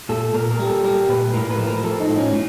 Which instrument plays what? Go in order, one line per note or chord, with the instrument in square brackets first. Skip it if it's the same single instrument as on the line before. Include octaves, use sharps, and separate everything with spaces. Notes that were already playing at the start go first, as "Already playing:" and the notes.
[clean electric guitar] A#2 A4
A#2 A#4
A#4
G3
A4
G3 A#4
A#2 B4
A2 A#4
B4
F3
A#4
F3 A4
D#4
A2
C#4
A2